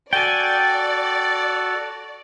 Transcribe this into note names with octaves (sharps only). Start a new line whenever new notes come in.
F#4 A4 D5 G5 G#5 A6